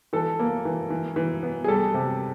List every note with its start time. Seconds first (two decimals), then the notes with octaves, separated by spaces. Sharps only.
0.13 E3 A4
0.39 A#3
0.65 E3
0.90 E3
1.16 E3
1.43 B3
1.64 G#4
1.68 G3 A4
1.94 C3